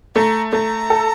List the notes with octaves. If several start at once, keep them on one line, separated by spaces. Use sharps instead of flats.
A3 A#5
A3 A#5
A4